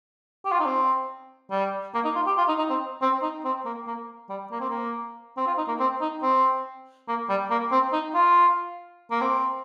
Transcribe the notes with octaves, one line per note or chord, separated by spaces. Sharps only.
G4
F4
D#4
C4
G3
A#3
D#4
F4
G4
F4
D#4
D#4
C4
C4
D#4
C4
A#3
A#3
G3
A#3
C4
A#3
C4
F4
D#4
A#3
C4
D#4
C4
A#3
G3
A#3
C4
D#4
F4
A#3
C4